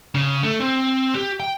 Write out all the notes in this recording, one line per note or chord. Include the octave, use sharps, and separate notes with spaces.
C#3
A3
C4
G4
G5